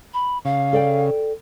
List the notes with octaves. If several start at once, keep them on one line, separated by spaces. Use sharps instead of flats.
B5
C#3 F5
A4 D5 G5